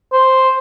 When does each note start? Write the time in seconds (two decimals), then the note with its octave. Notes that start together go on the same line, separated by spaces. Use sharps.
0.12 C5